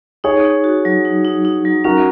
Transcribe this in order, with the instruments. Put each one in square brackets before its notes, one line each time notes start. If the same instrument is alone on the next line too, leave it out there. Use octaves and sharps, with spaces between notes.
[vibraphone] D#4 [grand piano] G#4 C#5
[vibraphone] D#4
F#4
F#3
D#4
D#4
D#4
F#3
[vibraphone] C#4 [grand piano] F#4 A#4